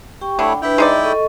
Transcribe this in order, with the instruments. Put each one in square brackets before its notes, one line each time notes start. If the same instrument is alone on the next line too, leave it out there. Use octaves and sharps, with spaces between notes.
[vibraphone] G4 G5 C#6
[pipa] D3 [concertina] A3 E4 C#5 [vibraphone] G5 B5
[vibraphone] D4 B4 [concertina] E4 G5
[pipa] G#3 D#4 D5 [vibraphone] D#5
[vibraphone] A4 D#5 C#6